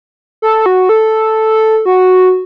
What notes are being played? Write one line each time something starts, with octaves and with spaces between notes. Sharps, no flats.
A4
F#4
A4
F#4